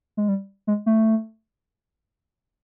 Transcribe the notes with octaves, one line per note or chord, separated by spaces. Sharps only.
G#3
G3
G#3
A3